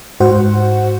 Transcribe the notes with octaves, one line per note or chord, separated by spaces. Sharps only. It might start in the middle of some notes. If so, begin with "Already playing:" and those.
G#2 F#4 C5 F#5